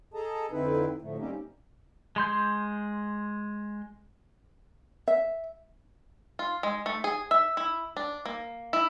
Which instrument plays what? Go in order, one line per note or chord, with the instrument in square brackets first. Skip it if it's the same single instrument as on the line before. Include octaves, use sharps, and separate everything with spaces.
[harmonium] G#4 A4 D#5 A5 A#5
F2 D3 C4 D#4 E4 B4
A2 D3 F3 A3
G3 A#3 C4 C#4 D#4 G4
[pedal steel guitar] G#3 C6 G6
[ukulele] E5
[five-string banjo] F4
G#3
A3
G#4
E5
E4
D4
A#3
E4